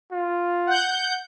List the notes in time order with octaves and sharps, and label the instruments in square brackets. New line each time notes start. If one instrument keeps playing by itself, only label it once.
[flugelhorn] F4
[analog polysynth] F#5 G6